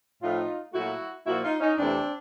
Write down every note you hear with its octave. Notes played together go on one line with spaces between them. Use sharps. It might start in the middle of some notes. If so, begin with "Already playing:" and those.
A2 F3 A3 D#4 F4
A#2 F#3 A3 E4 F#4
A#2 F3 A#3 E4 F#4
D#4 F4
C#4 D#4
E2 C3 E3 A3 C4 D4